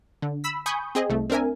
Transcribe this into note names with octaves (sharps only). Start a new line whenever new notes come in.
D3
B5 E6 B6
G#5 B5 C#6 D#6 G6
C4 G#4 D#5
C2 A3
C4 D4 A#4 E5 G#5